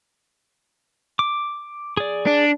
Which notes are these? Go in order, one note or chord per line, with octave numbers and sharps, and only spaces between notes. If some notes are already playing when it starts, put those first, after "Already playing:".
D6
G#4 D5
D4